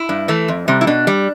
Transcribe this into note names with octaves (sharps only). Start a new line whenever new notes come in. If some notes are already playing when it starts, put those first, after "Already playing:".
Already playing: E4
G2
E3 A3
F2
C3 G3
E4
B2 D4
G3